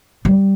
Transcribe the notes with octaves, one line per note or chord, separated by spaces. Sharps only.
G3